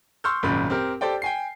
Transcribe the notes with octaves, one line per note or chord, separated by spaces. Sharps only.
C6 C#6 E6 F6 G6
G#1 F#2 A#2 C#3 B5
C4 G4 A#4
G4 A4 C5 D5 G5
G5 G#5 C7